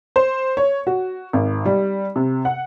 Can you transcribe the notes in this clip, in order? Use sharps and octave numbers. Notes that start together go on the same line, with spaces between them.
C5
C#5
F#4
G#1
G3
C3
F#5